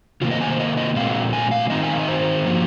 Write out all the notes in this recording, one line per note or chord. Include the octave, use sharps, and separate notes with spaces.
C3 D#3 A#3 F4
D#5
G#5
C5
D#5
D#5
A#2 G#3 C4 F5
G#5
F5
D#3 C4 D#4 D#5
G#5
F5
D#5
C5
F3 A#3 D#4